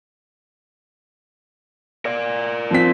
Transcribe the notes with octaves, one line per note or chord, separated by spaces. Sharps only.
A#4 D5
F3 C4 B6